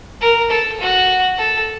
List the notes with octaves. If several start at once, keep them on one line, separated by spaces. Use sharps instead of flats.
A#4
A4
F#4
A4